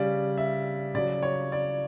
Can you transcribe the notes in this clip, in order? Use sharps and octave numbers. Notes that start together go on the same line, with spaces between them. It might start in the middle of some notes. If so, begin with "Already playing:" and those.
Already playing: C#3 G3 D5
E5
C#3 F#3 D5
C#5
D5